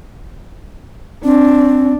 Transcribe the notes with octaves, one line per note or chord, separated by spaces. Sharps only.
C4 D4